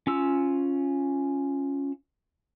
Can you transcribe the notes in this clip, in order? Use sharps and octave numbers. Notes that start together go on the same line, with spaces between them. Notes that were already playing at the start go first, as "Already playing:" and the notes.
C#4 F4 E6